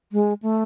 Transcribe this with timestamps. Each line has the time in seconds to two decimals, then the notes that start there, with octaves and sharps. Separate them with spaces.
0.12 G#3
0.42 A3